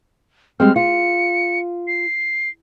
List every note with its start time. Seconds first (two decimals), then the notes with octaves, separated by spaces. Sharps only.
0.60 G3 G#3 C4 F6
0.76 F4 C#7
1.87 C7